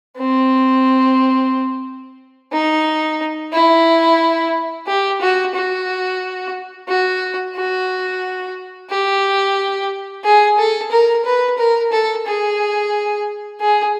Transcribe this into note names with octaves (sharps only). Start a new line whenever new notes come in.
C4
D#4
E4
G4
F#4
F#4
F#4
F#4
G4
G#4
A4
A#4
B4
A#4
A4
G#4
G#4